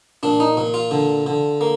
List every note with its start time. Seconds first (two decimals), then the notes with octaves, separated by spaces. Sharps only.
0.23 A#2 D4
0.40 D#4
0.57 A#2
0.74 F4
0.91 D3
1.26 D3
1.61 A#3